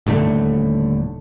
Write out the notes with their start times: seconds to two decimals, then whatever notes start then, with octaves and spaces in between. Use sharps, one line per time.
0.07 D#1 A2 D3 A3